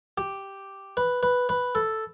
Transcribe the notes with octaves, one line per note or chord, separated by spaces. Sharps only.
G4
B4
B4
B4
A4